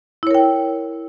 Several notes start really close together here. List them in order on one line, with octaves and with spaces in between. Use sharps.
E4 C#5 A#4 G5